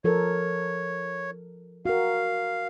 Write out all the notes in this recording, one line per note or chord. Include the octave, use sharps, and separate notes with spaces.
F3 A4 A#4 C#5
F#4 A#4 F5